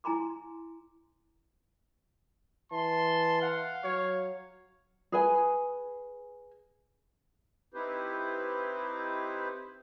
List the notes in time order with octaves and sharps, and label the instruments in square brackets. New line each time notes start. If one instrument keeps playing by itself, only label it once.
[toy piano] E4 G#5 A#5 C6 D6
[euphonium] E3 [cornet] A5 [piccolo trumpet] C6
[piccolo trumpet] F5 [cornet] F#5
[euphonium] F#3 [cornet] C#5
[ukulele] G#4 B4 G#5
[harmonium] C4 D#4 E4 G4 B4 C5